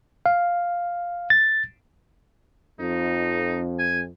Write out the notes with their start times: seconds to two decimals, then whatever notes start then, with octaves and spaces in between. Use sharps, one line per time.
0.26 F5
1.30 A6
2.80 F2 D#4
3.79 G#5